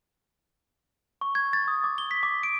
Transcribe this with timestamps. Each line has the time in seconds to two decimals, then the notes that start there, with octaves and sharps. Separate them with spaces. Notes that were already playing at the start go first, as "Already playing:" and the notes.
1.21 C#6
1.35 G#6
1.53 A6
1.68 D#6
1.84 D6
1.98 G7
2.11 B6
2.23 D6
2.43 D7